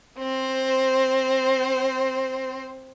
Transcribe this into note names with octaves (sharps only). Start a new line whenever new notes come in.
C4 C5